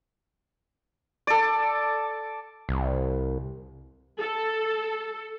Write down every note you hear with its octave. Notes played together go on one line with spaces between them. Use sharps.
A4 D5
C2
A4